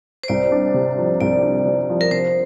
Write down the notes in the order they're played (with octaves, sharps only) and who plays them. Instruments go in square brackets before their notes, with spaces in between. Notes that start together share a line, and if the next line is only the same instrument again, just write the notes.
[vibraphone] C5
[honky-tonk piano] C2 [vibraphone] D5
[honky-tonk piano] D4
C3
F3
[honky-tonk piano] C2 [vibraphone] D5
[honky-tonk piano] D4
C3
F3
[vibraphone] A#4
[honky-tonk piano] C3 [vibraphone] C5